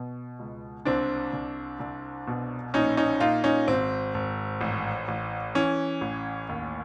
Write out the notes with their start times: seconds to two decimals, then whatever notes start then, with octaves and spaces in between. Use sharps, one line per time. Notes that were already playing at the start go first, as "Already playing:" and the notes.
Already playing: B2
0.39 C#2
0.85 C2 C4 D4
1.33 C2
1.80 C2
2.27 B2
2.74 A#1 C#4 D#4
2.97 C#4 D#4
3.20 A#2 D#4 F4
3.44 C#4 D#4
3.67 G#1 C4
4.14 G#1
4.61 A1
5.08 A1
5.55 E3 C#4
6.01 A1
6.49 D#2